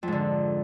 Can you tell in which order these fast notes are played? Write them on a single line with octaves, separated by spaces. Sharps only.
F2 G#2 D3